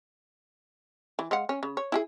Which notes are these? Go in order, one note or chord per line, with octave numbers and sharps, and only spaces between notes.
E3
G#3 F5 F#5
C#4
C#3
C#5
E4 G4 G#4